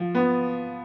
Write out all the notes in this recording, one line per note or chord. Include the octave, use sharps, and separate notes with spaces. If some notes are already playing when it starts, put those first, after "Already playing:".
Already playing: F3
B3